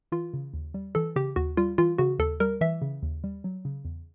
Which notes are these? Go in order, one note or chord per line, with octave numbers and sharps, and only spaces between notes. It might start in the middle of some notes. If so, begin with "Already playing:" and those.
E3 F4
C#3
D#2
G3
E3 A4
C#3 G4
D#2 F#4
G3 F4
E3 F4
C#3 F#4
D#2 A4
G3 A#4
E3 E5
C#3
D#2
G3
F#3
C#3
E2